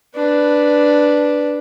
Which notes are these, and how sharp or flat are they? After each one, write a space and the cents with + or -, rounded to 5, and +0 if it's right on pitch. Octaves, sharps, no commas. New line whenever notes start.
D4 +0 B4 +0